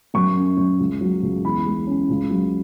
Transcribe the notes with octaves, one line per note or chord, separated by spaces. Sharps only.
F#2 C#6
C#4
F#2
C#2
F#3
C#2
E2 B5
G#3
C#4
C#2
F#3